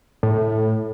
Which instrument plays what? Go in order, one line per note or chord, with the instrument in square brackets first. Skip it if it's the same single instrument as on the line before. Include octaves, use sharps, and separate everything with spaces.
[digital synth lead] A2